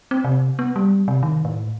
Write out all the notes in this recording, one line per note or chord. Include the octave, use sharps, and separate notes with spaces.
C4
C3
B3
G3
C3
D#3
A2